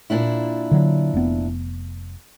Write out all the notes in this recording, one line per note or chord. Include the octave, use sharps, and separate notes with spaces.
A#2 D4 E4
D3 F#3
F1 B3